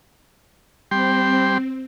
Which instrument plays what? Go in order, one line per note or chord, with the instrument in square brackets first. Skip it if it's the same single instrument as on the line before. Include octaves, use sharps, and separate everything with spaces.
[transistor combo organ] G3 G5 C6 [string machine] C4